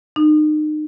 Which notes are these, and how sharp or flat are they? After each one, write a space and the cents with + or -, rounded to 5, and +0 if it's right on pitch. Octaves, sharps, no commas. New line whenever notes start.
D#4 -35